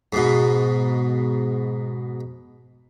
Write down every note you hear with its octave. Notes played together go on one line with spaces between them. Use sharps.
G#2 B2